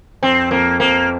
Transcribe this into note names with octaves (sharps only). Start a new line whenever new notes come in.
F2 C4
F2 A#3
F2 A#3